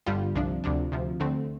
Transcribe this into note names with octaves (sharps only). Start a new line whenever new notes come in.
G1 G2 D3 G3 F4
C2 C3 F3 D4
D2 C3 F3 D4
D2 C3 F3
D2 D3 A3 C4